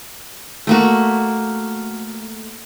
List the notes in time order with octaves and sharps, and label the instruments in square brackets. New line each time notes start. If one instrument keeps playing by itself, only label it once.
[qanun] A3 A#3 F#4